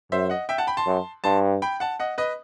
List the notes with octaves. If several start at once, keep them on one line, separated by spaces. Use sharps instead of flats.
F#2 C5 E5
D#5 F#5
E5 G5
F#5 A5
G5 B5
A5 C6
F#2
G2 A5 C6
G5 B5
F#5 A5
D#5 F#5
B4 D#5